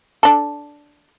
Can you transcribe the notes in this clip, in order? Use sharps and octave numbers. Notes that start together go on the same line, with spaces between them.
D4 A4